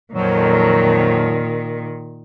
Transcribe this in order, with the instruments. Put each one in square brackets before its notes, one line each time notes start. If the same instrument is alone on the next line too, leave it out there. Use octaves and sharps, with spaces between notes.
[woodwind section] F2 F3 F#3 [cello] A#2 D#3